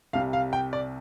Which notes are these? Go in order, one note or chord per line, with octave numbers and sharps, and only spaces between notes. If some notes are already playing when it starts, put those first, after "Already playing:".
C2 C3 G3 F5
F5
G5
D5